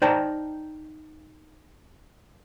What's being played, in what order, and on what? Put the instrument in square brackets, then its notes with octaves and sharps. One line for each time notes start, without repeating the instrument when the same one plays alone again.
[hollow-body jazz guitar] D#4 C5 D5 G5 A5 A#5